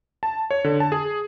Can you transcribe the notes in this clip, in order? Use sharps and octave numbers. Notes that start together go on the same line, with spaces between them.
A5
C#5
D3
A5
G#4